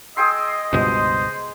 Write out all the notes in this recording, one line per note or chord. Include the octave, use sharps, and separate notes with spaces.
G#4 D#5 G5 C6 E6
C#2 G2 B2 G#3 C5